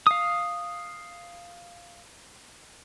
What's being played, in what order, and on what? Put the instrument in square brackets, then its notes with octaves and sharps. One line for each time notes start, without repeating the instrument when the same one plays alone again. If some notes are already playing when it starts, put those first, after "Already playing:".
[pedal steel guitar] F5 D#6